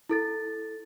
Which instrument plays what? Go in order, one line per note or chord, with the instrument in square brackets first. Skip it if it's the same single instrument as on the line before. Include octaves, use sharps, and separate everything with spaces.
[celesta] E4 A4 A6